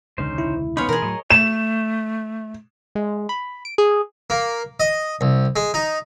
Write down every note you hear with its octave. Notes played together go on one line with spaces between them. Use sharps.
E1 C#2 D3 C#4 D#4 C5
E4
B3 C#4 D#4 C#5 F5 B5 C6
B2 E3 G#4 A#4
A2 F#3 C#5 D#5
A3 E7
G#3
B5
D7
G#4
A#3
D#5
C2
G#3
D#4